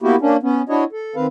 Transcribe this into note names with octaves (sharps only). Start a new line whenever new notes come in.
A#3 B3 E4 F#4 G4
A#3 C#4 D4
B3 C#4
D4 E4 F#4 C#5 D#5
A4
D#3 C4 B4 F5